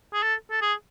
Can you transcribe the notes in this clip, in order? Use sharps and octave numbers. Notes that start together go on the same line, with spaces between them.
G#4
A4
A4
G#4